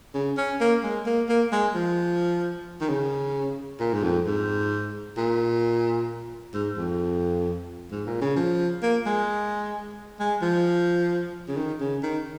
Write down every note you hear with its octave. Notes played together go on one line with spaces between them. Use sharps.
C#3
C#4
A#3
G#3
A#3
A#3
G#3
F3
D#3
C#3
A#2
G#2
F2
G#2
A#2
G#2
F2
G#2
A#2
C#3
F3
A#3
G#3
G#3
F3
C#3
D#3
C#3
D#3